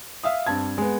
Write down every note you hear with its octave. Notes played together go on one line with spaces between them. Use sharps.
E5 F5 D#6
G2 C4 A5 G#6
G#3 B3